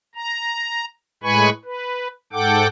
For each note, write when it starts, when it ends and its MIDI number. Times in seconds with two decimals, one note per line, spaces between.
0.15 0.85 82
1.23 1.50 45
1.23 1.50 56
1.23 1.50 71
1.23 1.50 80
1.23 1.50 83
1.23 1.50 85
1.65 2.08 71
2.33 2.67 44
2.33 2.67 69
2.33 2.67 78
2.33 2.67 79
2.33 2.67 86